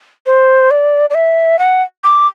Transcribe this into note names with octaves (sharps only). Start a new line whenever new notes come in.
C5
D5
D5
E5
F#5
D6